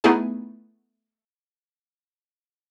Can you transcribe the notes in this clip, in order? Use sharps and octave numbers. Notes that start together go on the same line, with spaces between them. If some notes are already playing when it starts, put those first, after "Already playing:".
A3 B3 D#4 E4 G#4 G#5